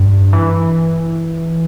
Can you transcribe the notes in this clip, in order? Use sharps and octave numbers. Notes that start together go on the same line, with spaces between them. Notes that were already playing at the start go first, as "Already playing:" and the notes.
Already playing: G2
E3